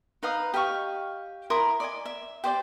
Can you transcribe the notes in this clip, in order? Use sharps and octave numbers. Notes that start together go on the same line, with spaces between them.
D#4 B4 F5 D#6
G4 D#5 F5 C#6
E4 A#4 C6 D#6
D5 D#5 G#5
E5
G4 C5 D5 G5